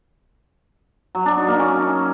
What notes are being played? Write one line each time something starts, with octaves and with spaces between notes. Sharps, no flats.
F#3
D4
D#4
A#3
C#4